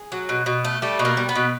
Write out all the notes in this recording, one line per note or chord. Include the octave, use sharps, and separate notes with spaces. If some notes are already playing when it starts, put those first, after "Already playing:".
Already playing: G#4
F#3
B2
B2
A3
G3 A3 A4
B2
A#3 A#4
G3
B3 B4
B2